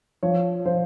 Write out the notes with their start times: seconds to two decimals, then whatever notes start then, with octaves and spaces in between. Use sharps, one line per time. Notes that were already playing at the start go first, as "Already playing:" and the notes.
0.23 F3 C#5
0.66 F3 C5